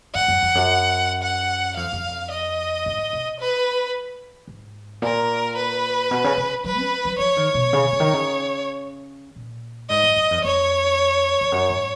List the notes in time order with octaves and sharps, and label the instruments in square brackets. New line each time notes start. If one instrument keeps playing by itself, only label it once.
[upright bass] G#2 [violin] F#5
[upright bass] F#2
F2
F#2
[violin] F#5
[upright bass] F2 [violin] F5
[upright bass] F2
[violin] D#5
[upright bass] G#2
B2
[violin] B4
[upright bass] G#2
[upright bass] A#2 [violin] A#4
[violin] B4
[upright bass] B2
C#3
C#3
[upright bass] F#3 [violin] B4
[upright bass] C#4
F#3
[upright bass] F3 [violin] C#5
[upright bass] D#3
B2
C#3
C#3
D#3
C#3
A#2
[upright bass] G#2 [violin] D#5
[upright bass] F#2
F#2
F2
[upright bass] F2 [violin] C#5
[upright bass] F2
F#2
G#2